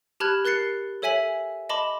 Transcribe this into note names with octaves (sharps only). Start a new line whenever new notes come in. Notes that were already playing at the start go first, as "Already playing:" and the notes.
G4 A5 B5 F6 F#6 G#6
A#4 F#6 A6 C7 C#7
A4 C#5 E5 G#5 B6 F#7
D#5 A5 B5 C6 D6